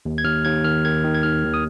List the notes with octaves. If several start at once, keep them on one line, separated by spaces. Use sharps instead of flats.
D#2
G#6
D#2 F6
D#2 G#6
D#3 F6
D#3 G#6
D#3
G#6
D#2 F6
D#2
D#6